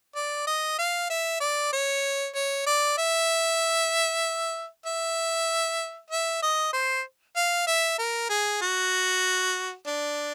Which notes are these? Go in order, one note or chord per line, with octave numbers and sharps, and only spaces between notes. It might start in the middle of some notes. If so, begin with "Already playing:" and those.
D5
D#5
F5
E5
D5
C#5
C#5
D5
E5
E5
E5
D#5
C5
F5
E5
A#4
G#4
F#4
D4